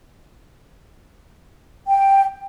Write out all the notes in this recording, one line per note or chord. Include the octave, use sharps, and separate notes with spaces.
G5